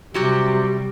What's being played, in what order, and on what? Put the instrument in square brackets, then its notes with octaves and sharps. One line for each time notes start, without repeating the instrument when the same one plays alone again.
[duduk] C3 [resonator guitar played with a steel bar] F#3 F#4 G4 [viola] G3